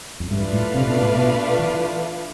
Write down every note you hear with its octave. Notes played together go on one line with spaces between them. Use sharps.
F2
G2 A3 D4 F4 B4 F5
A2
C3
B2
A2
B2
E3